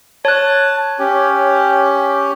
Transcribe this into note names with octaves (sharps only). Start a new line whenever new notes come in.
C#5 A5 F#6
C#4 G4